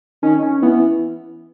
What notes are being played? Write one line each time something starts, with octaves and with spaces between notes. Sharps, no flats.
D#3 C#4
C#4
E3 B3